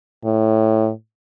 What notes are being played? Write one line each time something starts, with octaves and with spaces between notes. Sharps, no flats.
A2